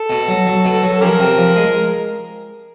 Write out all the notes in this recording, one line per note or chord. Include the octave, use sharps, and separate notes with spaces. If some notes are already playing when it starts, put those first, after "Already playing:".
Already playing: A4
B2
F#3
F#3
B2
F#3
A4
F3 C#4 G4 A#4
C3
F3
G#3